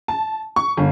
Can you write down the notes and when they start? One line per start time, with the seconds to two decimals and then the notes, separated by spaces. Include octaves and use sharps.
0.08 A5
0.56 C#6
0.77 G1